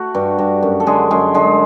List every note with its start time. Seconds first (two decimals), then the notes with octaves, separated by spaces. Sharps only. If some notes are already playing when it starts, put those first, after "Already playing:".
Already playing: A3 F#4
0.15 G2
0.39 G2
0.63 F#2
0.80 A4
0.87 D3 G#3 G#4
1.11 F#2 G#3 G#4
1.34 D3 G#3 G#4